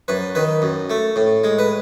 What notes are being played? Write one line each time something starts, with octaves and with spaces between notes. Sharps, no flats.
F#2 B4
D#3 B4
F#2
A3
A2
G#3
B4